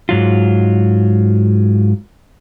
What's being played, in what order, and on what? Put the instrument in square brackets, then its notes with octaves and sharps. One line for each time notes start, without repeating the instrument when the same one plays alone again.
[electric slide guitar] G#2 F#3 F4